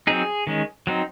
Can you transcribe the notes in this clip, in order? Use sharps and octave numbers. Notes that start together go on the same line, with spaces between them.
F#3 C4 D#4 G#4
D#3 G#3 C#4
F#3 C4 D#4